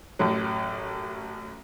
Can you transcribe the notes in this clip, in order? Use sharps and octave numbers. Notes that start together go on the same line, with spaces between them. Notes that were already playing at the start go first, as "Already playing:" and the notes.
A1 F#2 A2 F#3